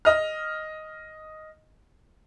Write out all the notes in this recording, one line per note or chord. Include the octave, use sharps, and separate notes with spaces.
D#5 F6